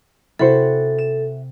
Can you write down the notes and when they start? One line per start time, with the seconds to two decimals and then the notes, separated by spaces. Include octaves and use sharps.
0.39 C3 E4 F#4 A4 C5 F#5 C#7
0.98 E7